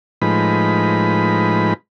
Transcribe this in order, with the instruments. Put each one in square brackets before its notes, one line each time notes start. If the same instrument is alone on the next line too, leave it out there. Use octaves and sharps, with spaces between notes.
[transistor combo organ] A2 F3 G#3 D#4 B4 B5